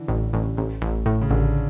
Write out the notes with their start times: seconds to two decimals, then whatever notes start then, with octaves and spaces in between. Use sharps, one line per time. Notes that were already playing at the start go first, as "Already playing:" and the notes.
Already playing: D3 E3
0.08 A1
0.33 A1
0.57 A1
0.82 A1
1.06 A2
1.21 C#3
1.30 A1 D3